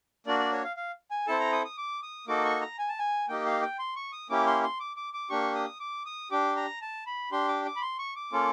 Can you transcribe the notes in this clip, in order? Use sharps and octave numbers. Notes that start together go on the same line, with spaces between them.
A#3 D4 F#4 D5
D5
C#5
F5
F5
G#5
C4 E4 A4 A5
A#5
D#6
D#6
D6
D#6
A#3 D#4 F#4 A4 D6
C#6
A#5
G#5
A5
G#5
A#3 D#4 G4 G5
F5
G5
C6
C#6
D#6
A#3 C#4 E4 G4 D6
C6
C6
D6
D6
D6
A#3 D4 G4 C#6
D#6
D6
D#6
D4 G4 D6
A#5
A5
B5
D4 G4 C6
D6
D6
B5
C6
C#6
D6
A#3 C#4 F4 A4